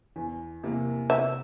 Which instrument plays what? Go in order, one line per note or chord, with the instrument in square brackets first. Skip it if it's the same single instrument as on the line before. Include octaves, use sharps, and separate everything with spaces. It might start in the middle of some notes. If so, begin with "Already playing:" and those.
[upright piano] E2
C3 E3 A#3
[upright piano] C3 [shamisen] E5